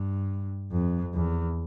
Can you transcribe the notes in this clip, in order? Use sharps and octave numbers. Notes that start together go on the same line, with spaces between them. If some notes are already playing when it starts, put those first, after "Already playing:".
Already playing: G2
F2
E2